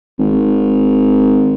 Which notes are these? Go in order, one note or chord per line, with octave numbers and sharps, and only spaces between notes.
G#1